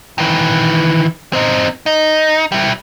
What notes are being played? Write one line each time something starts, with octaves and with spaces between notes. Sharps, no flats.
D#3 E3
C4 D#4
D#4
G3 E4